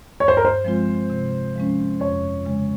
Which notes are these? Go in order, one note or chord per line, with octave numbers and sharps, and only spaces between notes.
G2 C#5
C5
A#4
C5
F3 G#3 C4 F4
C3
F3 G#3 C#4
F2 C#5
C#3 G#3